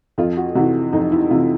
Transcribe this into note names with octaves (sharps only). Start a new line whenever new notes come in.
F2 F4
F#4
C3 E3 F#4
F2 D#4
E4
C3 E3 F4